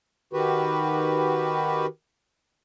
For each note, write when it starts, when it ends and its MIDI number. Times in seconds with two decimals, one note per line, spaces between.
0.33 1.86 51
0.33 1.86 66
0.33 1.86 67
0.33 1.86 71